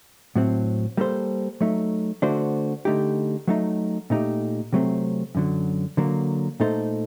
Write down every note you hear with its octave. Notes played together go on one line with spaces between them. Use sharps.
A2 F#3 C4
G3 A#3 F#4 A4 C5
F#3 A3 D#4
D3 A3 D4 F#4 C5
D3 A3 D#4 G4
F#3 A3 D#4
A#2 A3 D#4 G4
C3 F#3 A3 C4
F#2 D3 F#3
D3 F#3 A#3
A#2 A3 D#4 A4 C5